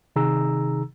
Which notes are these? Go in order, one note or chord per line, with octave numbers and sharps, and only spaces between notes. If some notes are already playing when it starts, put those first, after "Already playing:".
C3 D#3 D#4 G#4 A#5 E6